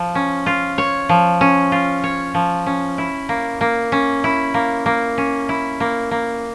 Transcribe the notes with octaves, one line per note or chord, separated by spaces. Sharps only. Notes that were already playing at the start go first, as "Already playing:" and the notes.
Already playing: F3
C#4
F4
C#5
F3
C#4
F4
C#5
F3
C#4
E4
A#3
A#3
C#4
E4
A#3
A#3
C#4
E4
A#3
A#3